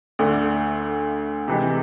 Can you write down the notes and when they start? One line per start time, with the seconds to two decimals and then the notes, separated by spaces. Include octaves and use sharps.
0.19 D2 D3 A3
1.48 C3 E3 G#3